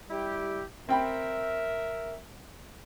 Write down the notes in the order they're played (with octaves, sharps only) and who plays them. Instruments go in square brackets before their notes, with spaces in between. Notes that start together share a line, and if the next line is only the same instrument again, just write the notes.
[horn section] G3 E4 G4
[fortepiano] C4 G5 B5 [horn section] A#4 E5